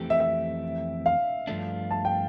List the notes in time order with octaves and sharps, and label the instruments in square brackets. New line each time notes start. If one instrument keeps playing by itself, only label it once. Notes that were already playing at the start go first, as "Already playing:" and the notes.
Already playing: [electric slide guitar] F2 E3 A3 C4 G4
[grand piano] E5
E5
F5
[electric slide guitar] G2 F3 A3 D4
[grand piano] A5
G5